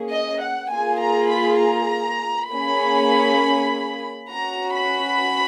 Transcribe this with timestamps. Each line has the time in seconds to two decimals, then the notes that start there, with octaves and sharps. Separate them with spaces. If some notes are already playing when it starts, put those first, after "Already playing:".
Already playing: A#3 C#4 G#4
0.11 D#5
0.42 F#5
0.71 A#3 F4 G#4 G#5
1.02 A#5
1.32 B5
1.61 A#5
2.51 A#3 C#4 G#4 B5
4.31 C#4 F#4 A#5
4.76 B5